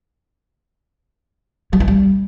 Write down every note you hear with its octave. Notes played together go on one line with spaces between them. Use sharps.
F#3
E3
G3